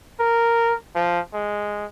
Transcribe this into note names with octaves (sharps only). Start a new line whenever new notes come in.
A#4
F3
G#3